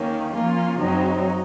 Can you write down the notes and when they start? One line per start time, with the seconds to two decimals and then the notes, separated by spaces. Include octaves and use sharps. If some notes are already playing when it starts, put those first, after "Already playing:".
Already playing: D#2 D#3 A#3 C#4
0.33 F3 A#3 C#4 F4
0.79 F#2 C#3 F#3 C4 D#4